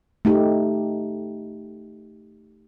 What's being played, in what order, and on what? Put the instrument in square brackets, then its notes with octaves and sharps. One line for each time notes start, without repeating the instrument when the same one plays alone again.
[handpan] A3 D#4 G4